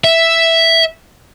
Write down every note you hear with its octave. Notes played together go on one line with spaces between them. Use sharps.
E5